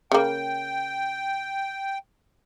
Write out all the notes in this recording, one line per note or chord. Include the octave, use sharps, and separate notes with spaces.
C#3 A#3 G5